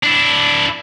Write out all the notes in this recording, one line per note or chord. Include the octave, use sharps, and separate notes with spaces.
D4 E4